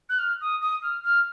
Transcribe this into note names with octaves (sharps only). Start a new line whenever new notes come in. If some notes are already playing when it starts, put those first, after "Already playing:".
F#6
F6
D#6
D#6
F6
F6